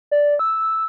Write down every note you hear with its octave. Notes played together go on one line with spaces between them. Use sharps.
D5
E6